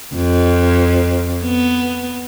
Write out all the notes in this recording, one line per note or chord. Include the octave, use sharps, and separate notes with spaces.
F2
B3